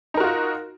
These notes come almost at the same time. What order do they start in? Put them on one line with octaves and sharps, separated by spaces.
D#4 A#4 F#4 F4